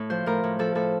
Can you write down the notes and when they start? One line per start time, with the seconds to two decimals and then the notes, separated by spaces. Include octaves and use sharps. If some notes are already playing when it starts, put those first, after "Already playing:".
Already playing: A2
0.10 F3 C5
0.26 A2 A#4
0.44 A2
0.59 F3 A4
0.75 A2 A4